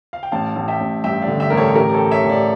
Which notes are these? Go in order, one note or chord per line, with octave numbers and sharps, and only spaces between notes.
F5
G5
A1 F5 A5
A1
E5 G5
A1
G2 E5 G5
D5 F5
D3
E5 G5
A1 A#4
A4 C#5
A1 G4 A#4
A4 C#5
A1
C#5 E5
A1
D5 F5